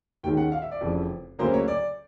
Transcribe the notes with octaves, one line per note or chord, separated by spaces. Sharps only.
D#2 D#3 G#3 C#4 G5
F#5
F5
E5
D5
F1 F2 C#3 E3
D2 C#3 F#3 A#3 C5
C#5
D5